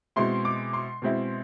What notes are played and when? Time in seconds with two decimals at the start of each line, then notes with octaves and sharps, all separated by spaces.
0.16 B2 G#3 C4 E4 C6
0.45 D6
0.73 C6
1.02 B2 G#3 C4 E4